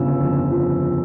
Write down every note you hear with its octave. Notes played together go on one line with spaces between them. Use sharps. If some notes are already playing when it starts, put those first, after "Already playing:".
Already playing: G1 C#3 F3 E6
F2
F3